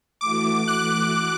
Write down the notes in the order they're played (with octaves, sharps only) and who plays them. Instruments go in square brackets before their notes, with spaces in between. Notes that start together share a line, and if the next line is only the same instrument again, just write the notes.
[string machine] E3 A3 F#4 [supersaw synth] D6
[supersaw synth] F#6